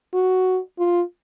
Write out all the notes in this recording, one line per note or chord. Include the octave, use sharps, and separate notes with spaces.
F#4
F4